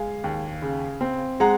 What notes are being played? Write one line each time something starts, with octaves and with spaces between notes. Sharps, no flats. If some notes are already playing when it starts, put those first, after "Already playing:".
Already playing: G#3 F5 G#5
D#2
C#3
C4
G#3 F#5 A#5